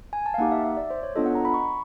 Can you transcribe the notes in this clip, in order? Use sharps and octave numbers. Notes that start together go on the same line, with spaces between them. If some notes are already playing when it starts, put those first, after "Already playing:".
G#5
A5
F5
A#3 D#4 G4 F#5
E5
E5
D5
C5
C#5
B3 D4 F4 A4 D#5
F#5
A#5
B5
C#6